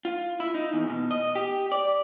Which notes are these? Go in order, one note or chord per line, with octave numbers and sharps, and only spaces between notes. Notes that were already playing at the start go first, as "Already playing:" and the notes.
F4
E4
D#4
E2
B2
D#5
G4
D5